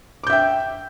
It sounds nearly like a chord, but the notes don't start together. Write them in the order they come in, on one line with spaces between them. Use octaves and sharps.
D6 G6 E5 G5